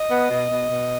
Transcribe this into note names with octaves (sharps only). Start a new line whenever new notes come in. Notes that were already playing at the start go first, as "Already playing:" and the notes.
Already playing: D#5
B3
B2
B2
B2